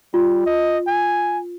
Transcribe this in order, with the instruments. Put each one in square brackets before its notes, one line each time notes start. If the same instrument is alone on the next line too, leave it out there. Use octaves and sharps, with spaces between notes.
[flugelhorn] G3 [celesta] F4
[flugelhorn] D#5
G#5